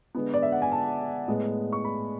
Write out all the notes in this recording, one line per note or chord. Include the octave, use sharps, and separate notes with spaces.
D3 G#3 B3
D5
E5
F#5
G#5
A5
A2 G#3 B3
C#6
B5